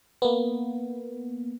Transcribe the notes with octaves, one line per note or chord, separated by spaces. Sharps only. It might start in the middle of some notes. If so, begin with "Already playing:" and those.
A#3 B3